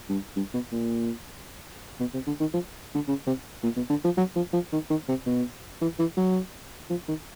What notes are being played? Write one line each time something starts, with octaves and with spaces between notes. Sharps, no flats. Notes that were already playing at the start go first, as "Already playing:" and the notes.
G2
G2
B2
A#2
B2
C3
D3
D#3
F3
D3
C#3
C3
A#2
B2
D3
F3
F#3
F3
F3
D#3
D#3
C3
B2
E3
E3
F#3
F3
D#3